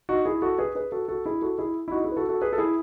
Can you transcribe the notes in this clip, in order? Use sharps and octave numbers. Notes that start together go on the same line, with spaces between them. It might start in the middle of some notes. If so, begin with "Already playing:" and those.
D#4 F#4
E4 G#4
F#4 A4
G#4 B4
G#4 B4
F#4 A4
F#4 A4
E4 G#4
F#4 A4
E4 G#4
E4
D#4 F#4
E4 G#4
B4
F#4 A4
F#4 A4
G#4 B4
A4
E4 G#4